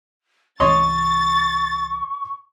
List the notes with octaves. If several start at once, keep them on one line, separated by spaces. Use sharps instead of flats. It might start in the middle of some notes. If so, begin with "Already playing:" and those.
C2 E3 C#5 D#5 C6 C#6 A6